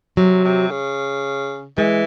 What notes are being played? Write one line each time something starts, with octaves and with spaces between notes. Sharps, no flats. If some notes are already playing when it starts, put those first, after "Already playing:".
C3 F#3
C3
C#3
E3 G#3